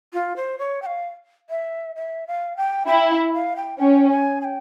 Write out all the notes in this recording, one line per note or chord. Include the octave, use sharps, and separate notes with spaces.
F4
C5
C#5
G5
F5
E5
E5
F5
G5
E4 G5
F5
E5
F5
G5
C#4 G5
G#5
G#5
G5